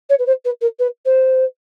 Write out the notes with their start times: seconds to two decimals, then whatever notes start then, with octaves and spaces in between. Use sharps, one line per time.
0.09 C#5
0.19 B4
0.26 C5
0.44 B4
0.61 A#4
0.79 B4
1.05 C5